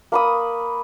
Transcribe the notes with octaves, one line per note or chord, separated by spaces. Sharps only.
A#3 B5 D#6